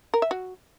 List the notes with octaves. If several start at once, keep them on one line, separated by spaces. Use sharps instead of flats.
A#4
E5
F#4